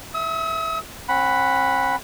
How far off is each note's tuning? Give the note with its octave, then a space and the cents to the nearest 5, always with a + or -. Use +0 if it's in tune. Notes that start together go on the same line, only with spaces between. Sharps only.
E5 +0 D#6 +45
C4 +45 F#5 +0 B5 +0